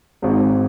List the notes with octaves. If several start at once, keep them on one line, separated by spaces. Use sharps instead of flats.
G#1 G#2